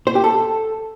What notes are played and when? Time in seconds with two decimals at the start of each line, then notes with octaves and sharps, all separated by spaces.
0.07 C5
0.15 G4
0.24 A4